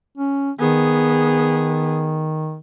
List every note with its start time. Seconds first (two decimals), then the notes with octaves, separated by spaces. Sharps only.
0.18 C#4
0.59 D#3 B3 G#4